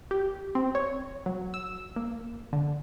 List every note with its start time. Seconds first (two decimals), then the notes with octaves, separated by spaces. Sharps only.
0.11 G4
0.55 C4
0.75 C#5
1.26 F#3
1.54 E6
1.96 A#3
2.53 D3